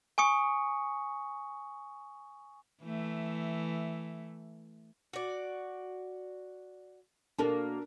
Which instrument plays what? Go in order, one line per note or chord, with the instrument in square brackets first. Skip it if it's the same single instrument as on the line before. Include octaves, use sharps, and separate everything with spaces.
[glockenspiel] G#5 C#6 D#6 C#7
[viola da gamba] E3 A3
[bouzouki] F#4 D5
[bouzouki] B2 A#3 [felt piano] D4 A4 A#4